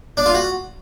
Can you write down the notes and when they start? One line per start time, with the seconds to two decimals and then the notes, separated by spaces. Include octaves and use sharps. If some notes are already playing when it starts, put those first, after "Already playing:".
0.17 D4
0.26 F4
0.34 F#4